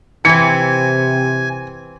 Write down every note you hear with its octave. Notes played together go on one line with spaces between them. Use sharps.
C3 E3 C4 G#5 C#7